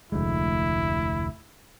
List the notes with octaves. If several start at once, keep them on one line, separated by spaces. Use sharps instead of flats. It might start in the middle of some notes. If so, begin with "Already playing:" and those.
F1 D2 G#3 E4